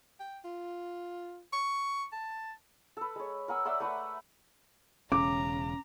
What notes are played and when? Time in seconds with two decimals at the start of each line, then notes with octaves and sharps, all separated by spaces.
0.20 G5
0.45 F4
1.53 C#6
2.12 A5
2.97 A4 B4
3.16 G#3 C#5
3.48 A#4 F#5 G#5 E6
3.65 D5 E5 F#5 C6
3.80 A3 B4 F#5 C#6
5.12 E1 C#3 C#4 A#5 D6